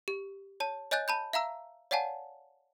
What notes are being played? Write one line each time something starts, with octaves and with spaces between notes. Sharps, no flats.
G4
C#5 A5
C#5 D#5 G#5 F#6 G6 A6
A5 B5 G6
E5 F5 A#5 E6
C#5 D5 F5 F#5 G#5 A5